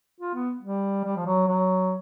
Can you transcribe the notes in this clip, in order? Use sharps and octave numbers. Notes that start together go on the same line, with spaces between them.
F4
B3
G3
G3
F3
F#3
F#3